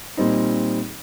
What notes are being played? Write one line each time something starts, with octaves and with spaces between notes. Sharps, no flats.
A#2 G3 C4 D#4